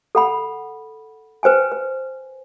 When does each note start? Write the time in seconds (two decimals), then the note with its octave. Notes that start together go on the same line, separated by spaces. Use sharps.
0.15 A4 F#5 B5
1.43 B4 C5 G5 G#5
1.72 B4